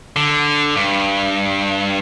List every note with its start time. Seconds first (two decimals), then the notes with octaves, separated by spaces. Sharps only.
0.16 D3
0.76 G2